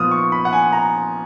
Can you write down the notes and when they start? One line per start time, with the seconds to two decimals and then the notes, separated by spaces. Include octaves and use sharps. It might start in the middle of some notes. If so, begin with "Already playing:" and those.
Already playing: A#2 F3 B3 D#6 F6
0.11 C#6
0.32 B5
0.45 F#5
0.53 G#5
0.73 A#5